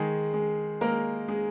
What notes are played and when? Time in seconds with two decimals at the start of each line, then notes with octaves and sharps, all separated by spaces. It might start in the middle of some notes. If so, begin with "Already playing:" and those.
Already playing: D#3 G#3 G#4
0.33 G#3
0.81 G#3 A#3 A#4
1.28 G#3 G#4